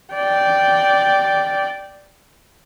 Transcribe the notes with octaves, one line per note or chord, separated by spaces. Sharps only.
D5 G5